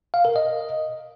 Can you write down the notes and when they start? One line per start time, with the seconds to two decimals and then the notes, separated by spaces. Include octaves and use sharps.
0.14 F5
0.25 A#4
0.36 D#5